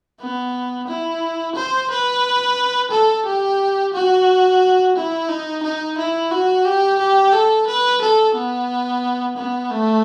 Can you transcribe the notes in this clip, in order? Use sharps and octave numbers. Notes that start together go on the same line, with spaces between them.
B3
E4
C5
B4
A4
G4
F#4
E4
D#4
D#4
E4
F#4
G4
G4
A4
B4
A4
B3
B3
A3